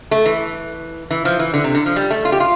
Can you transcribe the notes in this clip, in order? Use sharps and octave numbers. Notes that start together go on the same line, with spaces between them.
A3
E3
E3
F3
E3
D3
C3
D3
F3
G3
A3
F4
G4
F4